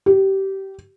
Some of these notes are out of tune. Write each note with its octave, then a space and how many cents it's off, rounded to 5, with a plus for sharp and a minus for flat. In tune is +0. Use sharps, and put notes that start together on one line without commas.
G4 -20